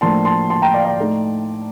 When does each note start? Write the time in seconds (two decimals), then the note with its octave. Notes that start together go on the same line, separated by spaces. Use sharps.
0.01 A2 F3 A#3 D4 A5 C6
0.25 A5 C6
0.50 A5 C6
0.62 G5 A#5
0.74 D5 F5
0.85 D5
0.97 A2 A3 D#4